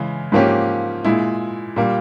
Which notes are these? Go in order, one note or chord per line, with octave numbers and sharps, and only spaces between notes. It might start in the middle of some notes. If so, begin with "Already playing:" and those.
Already playing: C#3 E3 G#3
G#2 F3 A#3 C#4 G4
A#2 G#3 E4
A#2 G3 A#3